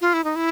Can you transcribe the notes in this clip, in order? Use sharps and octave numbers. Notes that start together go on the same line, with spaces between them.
F4
E4
D#4
E4